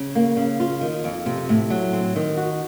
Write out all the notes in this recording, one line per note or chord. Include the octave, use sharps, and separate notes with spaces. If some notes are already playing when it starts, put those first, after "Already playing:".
Already playing: C#3
A#3
C#3
F4
D#3
F2
C3
A2
F#3
C4
D#3
F#4